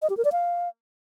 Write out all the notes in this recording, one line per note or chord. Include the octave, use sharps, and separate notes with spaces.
D#5
G4
A#4
D5
F5